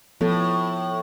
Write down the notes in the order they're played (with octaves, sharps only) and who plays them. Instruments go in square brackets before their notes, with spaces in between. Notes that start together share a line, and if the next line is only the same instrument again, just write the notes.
[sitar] A2 [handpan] F3 B3 A4